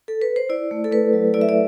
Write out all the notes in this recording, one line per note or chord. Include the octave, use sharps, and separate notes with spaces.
A4
B4
C5
E4 D5
A3
A4
A3 B4
F#3
E4 D5
E5
D5